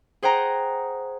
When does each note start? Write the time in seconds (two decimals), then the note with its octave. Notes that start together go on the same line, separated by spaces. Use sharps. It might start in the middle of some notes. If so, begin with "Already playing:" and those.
0.23 G#4 C5 F#5 G5 A#5